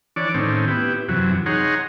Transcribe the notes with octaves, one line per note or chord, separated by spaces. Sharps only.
E3 D4 C#5 D5
A2 D#3 C4 C#4
B3 E4 G4
F#2 C3 E3 F#3
D#4 G#4 C#5 F#5 A#5 C6